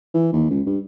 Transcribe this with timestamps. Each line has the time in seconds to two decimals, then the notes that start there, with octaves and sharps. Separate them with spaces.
0.14 E3
0.33 D#2
0.50 C#2
0.66 G2